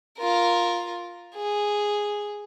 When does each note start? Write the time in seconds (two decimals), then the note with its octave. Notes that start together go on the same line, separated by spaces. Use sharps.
0.18 F4 A#4
1.35 G#4